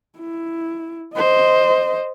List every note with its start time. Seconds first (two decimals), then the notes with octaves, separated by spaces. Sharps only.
0.18 E4
1.15 C5 D#5